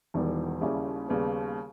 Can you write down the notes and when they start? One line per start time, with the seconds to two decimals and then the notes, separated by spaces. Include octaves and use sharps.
0.14 E1 E2 D#3 G3
0.61 D#2 C#3 G3 C#4 E4
1.08 D#2 C#3 G3 B3